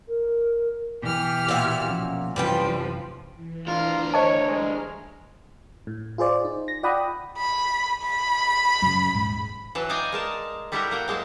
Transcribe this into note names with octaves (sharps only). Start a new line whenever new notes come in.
A#4
B2 E3 G4 F6
A#2 F#4 E5
B2 F3 C#4
F#2 C3 E3 F3 G3 C#4 B4 G5
E3
D2 F4 A#4
C5 C#5 D#5 A5
G3 G#3 F6
A2
F4 G#4 C5 D5
D#4
A#6
F4 D5 F#5 G5 B5 D#6
B5
B5
F#2 C#3
D#1 G#2
E3 F#3 A5
D#4 D5 D#5 F5 G5 G#5
G#3 A#4 A5
G3 A3 E4 F#4 G4 A#4
A#3 F#5 G5
F#3 G#3 A#3 A5